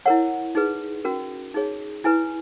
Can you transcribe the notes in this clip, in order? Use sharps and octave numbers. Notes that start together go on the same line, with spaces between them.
E4 A#4 C#5 F#5
D#4 G#4 B4
C#4 F#4 A#4
D#4 G#4 C#5
E4 B4 G#5